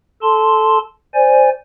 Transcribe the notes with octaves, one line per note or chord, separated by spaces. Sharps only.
A4 A5 C6
C5 D5 G#5